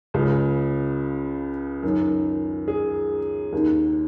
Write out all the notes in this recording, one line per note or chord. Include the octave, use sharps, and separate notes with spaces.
C#2 C#3
F#2 D#3
G#4
D#2 D#3